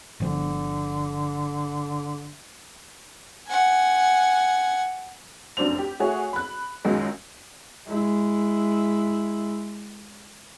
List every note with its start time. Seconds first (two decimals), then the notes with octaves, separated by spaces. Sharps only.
0.20 G1 D3 F3
3.47 F#5 G#5
5.57 F1 F#2 D4 C5 F7
5.78 G4
6.00 A3 F#4 G#4 C#5
6.33 B5 F#6
6.85 C#2 F#2 D#3 G#3
7.87 G#3 E4